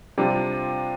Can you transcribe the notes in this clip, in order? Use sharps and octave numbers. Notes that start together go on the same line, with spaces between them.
C3 G3 D4 F4